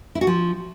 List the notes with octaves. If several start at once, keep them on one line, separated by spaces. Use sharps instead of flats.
E4
F#4
F3